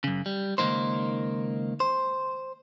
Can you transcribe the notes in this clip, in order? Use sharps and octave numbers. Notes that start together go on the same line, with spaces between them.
F#2 C#3
G3
C#2 C3 D#3 A#3 D#4 C5
C5